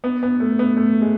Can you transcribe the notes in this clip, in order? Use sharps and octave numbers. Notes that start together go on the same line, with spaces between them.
B3
B3
A3
B3
A3
G#3